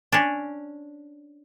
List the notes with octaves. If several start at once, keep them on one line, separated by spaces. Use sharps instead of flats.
C#4 D4